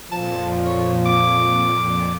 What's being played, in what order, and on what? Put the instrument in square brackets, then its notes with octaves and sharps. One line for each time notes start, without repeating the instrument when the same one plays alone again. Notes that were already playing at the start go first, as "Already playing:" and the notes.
[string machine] F2 A#2 [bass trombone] F3 [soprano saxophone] A5
[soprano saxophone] C#5
D6